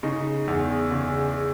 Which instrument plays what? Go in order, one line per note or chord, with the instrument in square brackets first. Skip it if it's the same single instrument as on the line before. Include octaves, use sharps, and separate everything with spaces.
[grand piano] C#3 D#4
E2
C#3